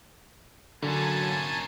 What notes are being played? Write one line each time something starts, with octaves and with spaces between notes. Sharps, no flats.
D3 F#3 A#3 C#4 G#5 A5